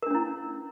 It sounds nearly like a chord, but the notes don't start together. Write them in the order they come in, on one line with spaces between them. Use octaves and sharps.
A#4 D4 C#4 E4